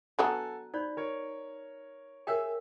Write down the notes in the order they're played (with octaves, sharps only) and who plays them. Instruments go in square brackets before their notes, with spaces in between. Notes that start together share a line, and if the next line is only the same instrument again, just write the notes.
[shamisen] F#3 B3 D4 [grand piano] A4 G#5 F#6 [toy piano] F#5 A#5
[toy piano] D#4 C5 D5 [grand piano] B5
[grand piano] A#4 C#5
[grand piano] G#4 E5 E6 [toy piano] A#4 C#5 G5